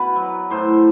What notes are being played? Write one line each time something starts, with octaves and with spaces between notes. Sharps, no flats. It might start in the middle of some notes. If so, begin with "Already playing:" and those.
Already playing: B2 B4
F#3
A2 C5